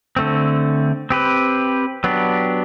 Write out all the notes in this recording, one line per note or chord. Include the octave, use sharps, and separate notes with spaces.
D3 A3 C4
C4 G4 B4
F#3 B3 D4 G4